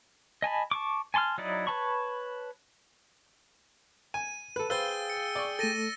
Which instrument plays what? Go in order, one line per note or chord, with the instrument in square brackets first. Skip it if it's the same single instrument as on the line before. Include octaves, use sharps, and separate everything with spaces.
[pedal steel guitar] D#5 G#5 A5 B5
A5 C#6 D6
G#5 A5 C6 C#6 F6
F#3 D#4 E4 D5 D#5
B4 C#5 A5 B5 C#6
[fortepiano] G#5 [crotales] D#7
[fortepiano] A4 B4
[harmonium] G#4 G5 [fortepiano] B4 C5 [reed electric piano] F5 [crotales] E6 A6 G7
[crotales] C#7
[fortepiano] D5 C#6
[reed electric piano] A3 A4 [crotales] A6 A#6 D#7